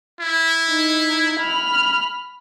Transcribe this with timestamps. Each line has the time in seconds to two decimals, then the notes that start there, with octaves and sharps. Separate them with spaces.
0.20 E4
0.70 D#4
1.40 B5 F6